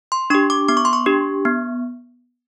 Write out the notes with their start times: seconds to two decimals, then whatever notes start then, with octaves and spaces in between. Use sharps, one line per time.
0.12 C6
0.30 D4 G4 C#6
0.50 D6
0.68 B3 D6
0.77 C#6
0.85 C6
0.93 C#6
1.06 D4 G4
1.45 B3